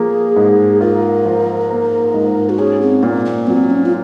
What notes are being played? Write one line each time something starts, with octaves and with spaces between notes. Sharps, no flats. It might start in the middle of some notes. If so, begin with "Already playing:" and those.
Already playing: F3 A#3 G#4
G#2
F4 A#4
F3
A#3
G#2
F#4
C#4 G#4
C4
A#2 A#3
A#3
F#3 C4
C#4
F4